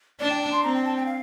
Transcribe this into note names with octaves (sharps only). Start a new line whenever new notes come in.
D4 D5
G5
A5
C6
C4 A#5
G5
A5
G5
F5